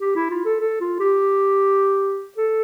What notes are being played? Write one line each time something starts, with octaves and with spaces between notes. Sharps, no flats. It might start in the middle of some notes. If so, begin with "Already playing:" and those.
G4
E4
F4
A4
A4
F4
G4
A4